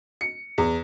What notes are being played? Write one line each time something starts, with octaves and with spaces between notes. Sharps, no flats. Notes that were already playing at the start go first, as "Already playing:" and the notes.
C#7
E2